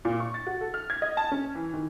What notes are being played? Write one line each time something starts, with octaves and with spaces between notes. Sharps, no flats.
A#2
C#6
A6
F#4
A4
F6
G#6
D#5
A5
C#4
E3
D#3